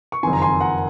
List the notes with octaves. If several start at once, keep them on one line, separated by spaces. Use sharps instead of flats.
C#6
F#1 F2 D#3 G#5 C6
A#5
G#5 C6
F#5 A#5